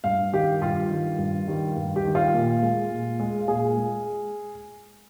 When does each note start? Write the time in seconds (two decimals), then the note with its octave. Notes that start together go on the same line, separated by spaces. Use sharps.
0.04 G2 F5
0.33 D#3 G3 G4
0.61 G2 F4
0.91 D#3 G3
1.18 G2
1.48 D#3 G3
1.77 G2
1.96 G4
2.04 D#3 G3
2.15 F4
2.34 A#2
2.62 G#3
2.91 A#2
3.20 G#3
3.48 A#2 G#4
3.76 G#3